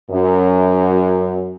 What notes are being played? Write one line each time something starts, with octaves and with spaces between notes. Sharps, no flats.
F#2